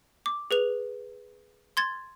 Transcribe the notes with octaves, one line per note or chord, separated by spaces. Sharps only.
D6
G#4 B4 F7
C6 G#6 A6